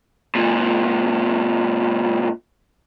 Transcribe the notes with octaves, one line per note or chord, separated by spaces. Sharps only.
C#2 A#2